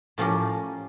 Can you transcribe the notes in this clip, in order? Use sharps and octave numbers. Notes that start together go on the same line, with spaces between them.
A2 F3 C#4 G4 A#4